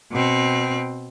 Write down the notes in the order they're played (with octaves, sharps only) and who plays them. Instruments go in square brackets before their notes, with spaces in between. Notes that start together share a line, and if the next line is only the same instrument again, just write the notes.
[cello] B2 C4